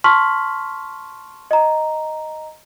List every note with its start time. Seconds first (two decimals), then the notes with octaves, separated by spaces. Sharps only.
0.04 A5 C6 C#6 F6 B6 F#7
1.51 D#5 A#5